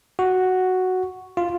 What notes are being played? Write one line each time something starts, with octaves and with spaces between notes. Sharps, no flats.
F#4
F4